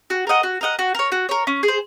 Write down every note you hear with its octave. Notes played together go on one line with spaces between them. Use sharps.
F#4
A#4 D#5 F#5
F#4
A#4 D#5 F#5
F#4
A#4 C#5
F#4
A#4 C#5
C#4
G#4
C5